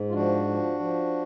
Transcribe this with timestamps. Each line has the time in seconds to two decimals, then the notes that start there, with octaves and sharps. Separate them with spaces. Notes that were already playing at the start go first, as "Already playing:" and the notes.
Already playing: G#2
0.09 F4
0.13 F3 D4 F#4
0.47 F3
0.80 F3